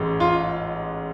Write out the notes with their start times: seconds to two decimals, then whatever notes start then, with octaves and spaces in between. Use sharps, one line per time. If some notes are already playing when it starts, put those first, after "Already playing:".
Already playing: A1 G#2 G#3
0.20 F4